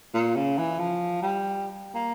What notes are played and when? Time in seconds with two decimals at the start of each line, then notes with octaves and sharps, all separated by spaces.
0.14 A#2
0.36 C#3
0.58 E3
0.79 F3
1.22 G3
1.95 A#3